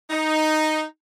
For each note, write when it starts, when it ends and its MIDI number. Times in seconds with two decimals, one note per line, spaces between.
0.10 0.84 63